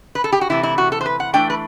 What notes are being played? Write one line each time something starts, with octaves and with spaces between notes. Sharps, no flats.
B4
A4
G4
F#4
C3 E3 A3 E4
E4
F#4
A4
C5
B4
F#5
E3 A3 D4 G5
B4